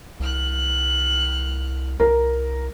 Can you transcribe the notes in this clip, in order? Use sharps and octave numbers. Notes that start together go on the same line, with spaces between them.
C2 G3 F6 F#6
C2 A#4